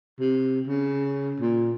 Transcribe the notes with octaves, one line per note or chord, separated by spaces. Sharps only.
C3
C#3
A#2